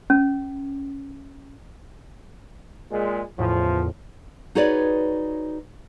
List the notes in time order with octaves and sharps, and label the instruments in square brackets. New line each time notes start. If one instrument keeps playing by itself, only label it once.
[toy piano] C#4
[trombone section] A#2 G#3
[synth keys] E2 A2 C#3 [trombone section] F3
[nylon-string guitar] D#4 F#4 G#4 B4 C#5 D5